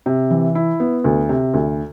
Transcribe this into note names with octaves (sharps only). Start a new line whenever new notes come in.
C3
E3
E4
B3
D2
C3
D2